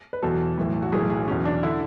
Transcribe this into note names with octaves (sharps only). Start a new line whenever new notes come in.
B4
E2 B2 F#3 A4
B1 A2 E3
F#4
B1 A2 E3 G#4
G#4
E2 B2 F#3 C#4
D4
D3 E4